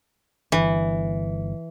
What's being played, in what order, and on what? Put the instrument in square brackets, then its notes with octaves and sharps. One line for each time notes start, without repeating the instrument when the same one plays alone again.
[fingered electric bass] G1 [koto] E3